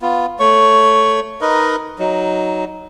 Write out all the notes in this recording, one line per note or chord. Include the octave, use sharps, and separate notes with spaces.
B3 F4
A3 C#5 C#6
D#4 A#4 B4 D#5
F#3 D#4